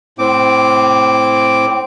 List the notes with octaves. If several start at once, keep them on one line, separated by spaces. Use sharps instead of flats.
A2 C4 D6